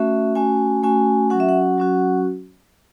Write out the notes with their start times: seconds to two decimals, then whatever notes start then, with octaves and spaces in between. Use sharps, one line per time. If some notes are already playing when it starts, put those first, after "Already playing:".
Already playing: A3 C#4 F#4 E5
0.35 A3 C#4 F#4 G#5
0.83 A3 C#4 F#4 G#5
1.30 F#3 C#4 F#4 F#5
1.40 E5
1.49 F#5
1.78 F#3 C#4 F#4